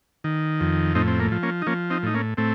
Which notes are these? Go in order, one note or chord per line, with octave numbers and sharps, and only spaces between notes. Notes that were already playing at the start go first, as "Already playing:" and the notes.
D#3
F2
A2 C4 D#4
C4
A#3
F3
A#3 C#4
D#4
F3 A#3 C#4
C4 D#4
A2 D#4
A#3 C#4
A2 A3 C4